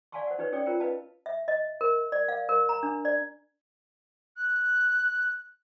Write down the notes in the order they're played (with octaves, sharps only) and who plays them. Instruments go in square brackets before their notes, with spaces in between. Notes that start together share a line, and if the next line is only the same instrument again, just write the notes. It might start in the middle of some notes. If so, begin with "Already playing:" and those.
[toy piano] D5 F5 G#5 A5 C6 C#6
C5 F#5
D4 D#4 G4 B4 C#5
C#4 G4 A4 C#5 D5 G5
F4 A#4 C5 G5
B4 D#5 F5 A5
E5
D#5
A#4
D5
F5
A#4
A#5
D4
D5
[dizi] F#6